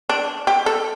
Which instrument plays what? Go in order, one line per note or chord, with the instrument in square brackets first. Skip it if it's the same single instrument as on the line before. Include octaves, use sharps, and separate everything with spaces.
[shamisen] D4
G4
A4